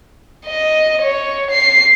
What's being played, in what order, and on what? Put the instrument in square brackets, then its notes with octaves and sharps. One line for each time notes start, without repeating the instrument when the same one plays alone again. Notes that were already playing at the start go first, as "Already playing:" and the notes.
[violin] D#5
C#5
C7